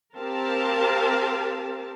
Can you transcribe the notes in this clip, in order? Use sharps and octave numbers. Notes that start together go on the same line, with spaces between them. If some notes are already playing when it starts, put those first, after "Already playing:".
C4 G4 A#4 F5 A5